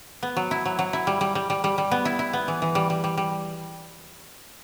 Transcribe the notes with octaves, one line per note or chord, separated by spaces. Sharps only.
B3
F#3
E4
F#3
F#3
E4
G3
G3
G3
G3
G3
G3
B3
E4
E4
B3
E3
E3
G3
G3
G3
G3